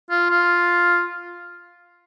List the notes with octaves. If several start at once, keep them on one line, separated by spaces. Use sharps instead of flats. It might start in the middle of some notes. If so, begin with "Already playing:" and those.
F4
F4